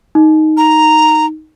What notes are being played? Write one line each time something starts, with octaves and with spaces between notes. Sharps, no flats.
D#4
A#5